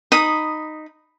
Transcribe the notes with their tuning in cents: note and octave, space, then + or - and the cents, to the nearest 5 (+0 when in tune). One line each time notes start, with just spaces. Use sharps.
D#4 -10 B5 +0 D#6 +0